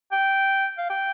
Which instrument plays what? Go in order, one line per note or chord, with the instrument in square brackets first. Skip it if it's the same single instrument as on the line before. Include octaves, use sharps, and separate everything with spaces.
[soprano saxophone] G5
F5
G5